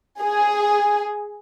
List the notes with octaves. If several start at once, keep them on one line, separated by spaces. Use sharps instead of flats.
G#4